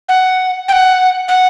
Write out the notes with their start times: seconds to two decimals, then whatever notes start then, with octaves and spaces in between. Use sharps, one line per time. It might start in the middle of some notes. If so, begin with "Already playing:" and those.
0.09 F#5
0.68 G5
0.73 F#5
1.28 F#5